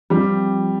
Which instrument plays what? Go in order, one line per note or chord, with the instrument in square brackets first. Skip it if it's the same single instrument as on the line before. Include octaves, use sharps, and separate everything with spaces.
[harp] F3 C4 F4 [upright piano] G3